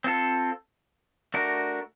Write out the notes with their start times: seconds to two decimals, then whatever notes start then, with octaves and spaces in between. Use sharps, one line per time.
0.04 C4 F4 A4
1.34 A3 D4 F#4 A#4